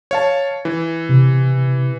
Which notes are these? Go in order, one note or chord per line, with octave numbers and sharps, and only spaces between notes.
C#5 F5 A5
E3
C3